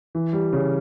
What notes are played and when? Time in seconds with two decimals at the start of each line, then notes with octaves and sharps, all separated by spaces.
0.15 E3
0.33 G3
0.53 C#3